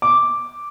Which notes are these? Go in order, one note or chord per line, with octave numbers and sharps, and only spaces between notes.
D6